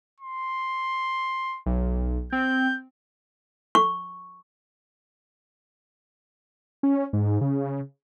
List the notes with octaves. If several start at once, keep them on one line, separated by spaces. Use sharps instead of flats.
C6
B1
C4 G6
C#6
C#4
G#2
C#3